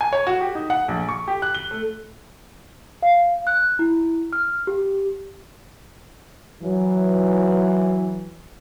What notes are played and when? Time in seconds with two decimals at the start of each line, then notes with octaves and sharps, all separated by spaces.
0.01 G#5
0.13 C#5
0.27 F#4
0.41 G4
0.55 D#4
0.70 F#5
0.88 A#1
1.09 C#6
1.28 G4
1.42 F#6
1.55 G7
1.71 A3
3.03 F5
3.47 F#6
3.79 E4
4.33 F6
4.67 G4
6.63 E3 F#3